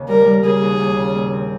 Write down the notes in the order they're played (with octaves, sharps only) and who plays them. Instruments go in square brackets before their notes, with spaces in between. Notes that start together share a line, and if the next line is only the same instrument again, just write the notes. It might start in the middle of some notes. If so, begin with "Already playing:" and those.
Already playing: [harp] D#2 C#3
[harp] G3 [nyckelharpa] A#4
[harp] G3
[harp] C#3 [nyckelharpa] G#4
[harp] D#2
D#2
C#3
A#2
C4